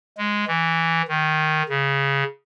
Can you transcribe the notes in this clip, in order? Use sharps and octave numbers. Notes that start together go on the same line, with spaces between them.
G#3
E3
D#3
C#3